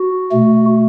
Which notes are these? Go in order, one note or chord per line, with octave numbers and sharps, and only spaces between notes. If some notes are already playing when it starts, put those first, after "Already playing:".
Already playing: F#4
B2 A3